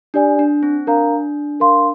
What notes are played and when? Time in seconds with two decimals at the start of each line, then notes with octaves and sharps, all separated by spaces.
0.14 D4 G4 D5 G#5
0.39 D4
0.63 C4
0.87 D4 A#4 F5 A#5
1.60 A#4 F5 C6